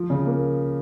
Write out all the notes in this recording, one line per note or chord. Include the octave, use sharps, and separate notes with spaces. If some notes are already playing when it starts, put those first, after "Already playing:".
Already playing: F3
C#3
A#3